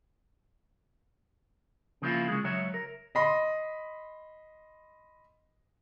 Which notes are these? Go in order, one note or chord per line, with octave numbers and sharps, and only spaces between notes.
C#3 F3 A#3 C#4 E4 F4
C#3 G#3
C#2 F#3 C#5 E5
A#4
D#5 B5 C6